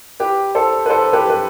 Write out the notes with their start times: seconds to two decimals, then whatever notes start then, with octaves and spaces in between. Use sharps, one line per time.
0.20 G4 B4
0.55 A4 C5
0.86 B4
0.90 A4 C5
1.13 G4 B4
1.30 B4